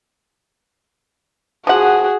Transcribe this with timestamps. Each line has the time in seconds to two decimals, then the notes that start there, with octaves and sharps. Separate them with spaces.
1.67 F3 F#4 G#4 F#5